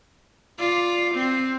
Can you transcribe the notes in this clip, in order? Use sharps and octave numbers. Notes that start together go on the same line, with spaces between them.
F4 D5
C4